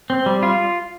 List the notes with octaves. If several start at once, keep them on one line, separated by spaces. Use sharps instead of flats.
C4
G3
F4